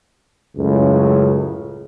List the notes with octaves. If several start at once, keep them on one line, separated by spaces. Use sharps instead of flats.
C#2 F#2 A2 C#3